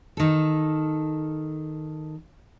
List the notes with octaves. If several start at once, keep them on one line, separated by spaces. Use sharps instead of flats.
D#3 A4